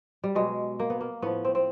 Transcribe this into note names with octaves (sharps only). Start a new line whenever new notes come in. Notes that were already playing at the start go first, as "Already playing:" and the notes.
G3
B2 F#3 G#3
A#3
B3
A#3
A2 F3 B3
C4
C4